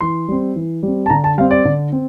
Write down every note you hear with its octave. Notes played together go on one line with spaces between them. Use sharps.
E3 C6
G3 C4
E3
G3 C4
A5
D3 A#5
A5
G3 C4 F5
D5
D3
C4